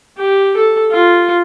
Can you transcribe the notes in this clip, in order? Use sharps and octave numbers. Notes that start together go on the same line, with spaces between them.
G4
A4
F4